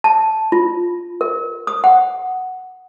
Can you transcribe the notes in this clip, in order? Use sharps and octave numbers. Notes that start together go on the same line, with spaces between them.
A5
F4
A#4
D#6
F#5